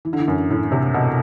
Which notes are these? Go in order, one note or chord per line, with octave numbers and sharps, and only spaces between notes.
E3
D3
E3
F#2
A2
C3
B2